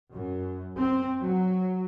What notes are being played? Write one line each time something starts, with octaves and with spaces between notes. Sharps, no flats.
F#2
C4
F#3